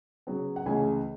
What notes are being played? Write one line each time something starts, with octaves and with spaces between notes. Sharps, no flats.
C#3 F#3 B3
F#5
C#2 C#3 E3 A3 C#4 G#5